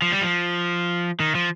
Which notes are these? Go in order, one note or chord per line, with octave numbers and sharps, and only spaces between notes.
F3
G3
F3
D#3
F3